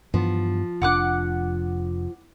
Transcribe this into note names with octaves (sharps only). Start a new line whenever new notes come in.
G2 E3 F3 B3
F1 D4 F#5 D6 F#6